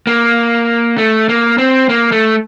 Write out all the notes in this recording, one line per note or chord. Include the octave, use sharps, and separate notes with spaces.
A#3
A3
A#3
C4
A#3
A3